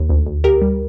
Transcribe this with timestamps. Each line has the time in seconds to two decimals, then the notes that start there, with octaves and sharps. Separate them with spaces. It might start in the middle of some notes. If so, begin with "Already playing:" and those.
Already playing: D#2
0.09 D2
0.26 D2
0.44 D2 G4 A#4
0.62 G3